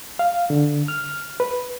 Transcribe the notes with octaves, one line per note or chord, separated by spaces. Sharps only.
F5
D3
F6
B4